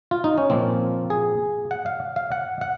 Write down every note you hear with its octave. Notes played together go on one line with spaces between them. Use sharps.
F4
D#4
C#4
A#2 F3 A#3 C4
G#4
F#5
F5
F5
F#5
F#5